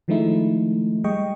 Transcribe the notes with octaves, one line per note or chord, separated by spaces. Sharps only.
D#3 F3 G#3 A3 D#4 E4
G3 G#3 D#5 G5 C#6